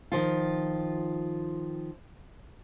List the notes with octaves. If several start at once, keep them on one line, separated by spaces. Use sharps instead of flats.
D#3 F3 F4